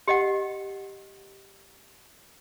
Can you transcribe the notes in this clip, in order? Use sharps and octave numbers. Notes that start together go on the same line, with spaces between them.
G4 D#5 F#5